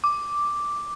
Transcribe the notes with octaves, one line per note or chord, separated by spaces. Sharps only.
D6